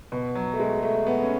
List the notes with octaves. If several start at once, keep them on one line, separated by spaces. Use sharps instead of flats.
B2
F#3
A3
G#3
A3
B3
C#4